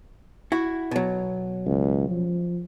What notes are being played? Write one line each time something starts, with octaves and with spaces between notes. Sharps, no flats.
E4 F#4
B2 F#3
C#2
F3